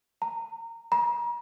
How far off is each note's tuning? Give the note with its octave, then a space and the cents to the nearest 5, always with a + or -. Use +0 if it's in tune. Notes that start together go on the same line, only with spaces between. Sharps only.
A#5 -20
A#5 +40